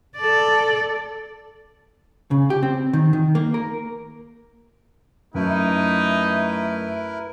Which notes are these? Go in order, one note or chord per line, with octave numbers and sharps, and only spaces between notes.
A4 D5
C#3
G4
C4
D#3
D#3
A#3
A#4
F#2 A3 D#4 E4 A#4 B4